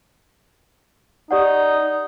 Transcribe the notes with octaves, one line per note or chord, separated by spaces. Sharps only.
D#4 G4 D5 F#5